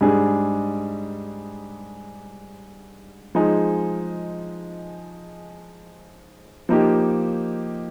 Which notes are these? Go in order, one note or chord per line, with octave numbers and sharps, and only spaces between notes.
G#2 G3 D4 G#4
F3 G#3 D#4 G#4
F3 A#3 D#4 G4